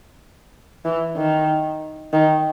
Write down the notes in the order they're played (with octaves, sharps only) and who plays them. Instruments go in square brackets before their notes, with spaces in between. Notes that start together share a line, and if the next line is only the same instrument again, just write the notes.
[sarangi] E3
D#3
D#3